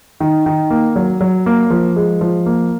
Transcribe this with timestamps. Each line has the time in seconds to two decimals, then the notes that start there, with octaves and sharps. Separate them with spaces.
0.21 D#3
0.46 D#3
0.70 A#3
0.96 F#3
1.21 F#3
1.46 A#3
1.71 F3
1.96 G#3
2.21 F3
2.46 A#3